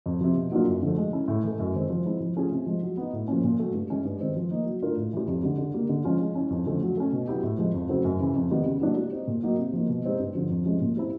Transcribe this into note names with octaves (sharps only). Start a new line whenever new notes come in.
F2
C3 F3
B2
F#3 A#3 D4 F4
F#2
D3 F3 A3
G#3
C#4 E4
A2
E3 A3
F#2
D#3 G#3 C4
F3
G#3 C4 E4
F3
A3 C#4 F4 G#4
C3
F3 G#3
F#3
B3 D#4
A2
F3 A#3 C#4
A#2
F#3 A3
G2
E3 G#3 C#4
G2
D#3 G#3 C4
F3
A#3 D#4
F#3
A3 D4 F4 A#4
A2
E3 G3
F2
D3 G3
D3
G3 A#3
D3
F3 G#3 C#4 F4
G#3
C#4 E4
F2
D3 F3 A3 C#4
F#3
A3 C#4
B2
F#3 B3 E4 G4
A2
F3 G#3 C4
F2
C#3 F#3 A3 C4
F#2
C#3 E3
F2
C3 D#3 G3 B3
C#3
F#3 A#3 D4 F#4
G3
C4 D#4
A#2
F#3 A#3 D#4 F#4
C3
F3 A#3 D#4
B2
G#3 C4 D#4 G4
G2
D3 F3
F2
C3 F3 G#3 C#4
A#2
G3 C4 E4